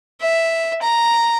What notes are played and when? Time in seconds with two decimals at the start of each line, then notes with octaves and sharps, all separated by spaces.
0.22 E5
0.82 A#5